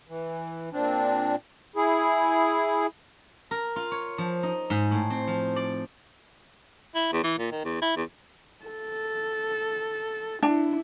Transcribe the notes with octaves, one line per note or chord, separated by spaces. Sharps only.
E3
A#2 C4 D4
E4 G#4
A#4
F4
C#5
F3
D#4
G#2
A2
C4
F3
D5
E4
E2
E3
A#2
D#3
E2
E4
E2
A4
D4 E4